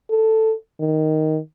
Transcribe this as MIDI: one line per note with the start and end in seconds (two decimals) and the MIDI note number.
0.10 0.53 69
0.80 1.38 51